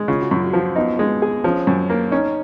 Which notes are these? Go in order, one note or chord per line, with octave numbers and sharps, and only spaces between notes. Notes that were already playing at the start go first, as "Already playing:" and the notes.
Already playing: G#3
C#3 F4
F#4
F#2 F4
F#4
F3
F4
B3 D#4
G#3
G#4
F3 C#4
F#2
A#3
C#4 D#4